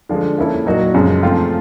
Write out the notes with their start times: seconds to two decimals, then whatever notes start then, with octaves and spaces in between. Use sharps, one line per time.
0.09 D3 F3 G#3
0.38 F3 A#3 C#4 E4 A4
0.65 A#2 F#3 A#3 D#4 F#4
0.94 F#2 C#3 F3 G#3
1.23 F3 A3 C4 F4